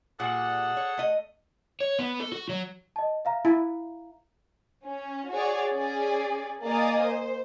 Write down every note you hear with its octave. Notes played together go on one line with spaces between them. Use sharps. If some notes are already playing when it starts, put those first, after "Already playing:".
A#2 G3 G#4 A4 F#5
C#5
A3 D#5
C#5
B3
A4
F#4
F#3
D#5 A5
E5 F5 A#5
E4
C#4
F#4 G#4 C#5 D5
C#4 G#4 D5
A#3 D5 D#5 G#5 D#6
C5